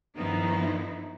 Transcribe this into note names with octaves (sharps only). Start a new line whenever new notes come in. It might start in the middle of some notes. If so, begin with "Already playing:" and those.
G2 D#3 F3 B3 D#4 E4